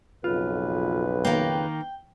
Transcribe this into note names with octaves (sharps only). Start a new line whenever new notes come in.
B1 F2 C#3 F4 B4
D#3 A#3 G5